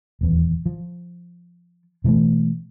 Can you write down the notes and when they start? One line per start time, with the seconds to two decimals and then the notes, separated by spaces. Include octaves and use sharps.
0.21 D#1 E2
0.66 F3
2.04 B2 E3 G#3 A3